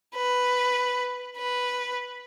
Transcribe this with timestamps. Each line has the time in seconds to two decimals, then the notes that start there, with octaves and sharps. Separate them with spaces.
0.15 B4
1.37 B4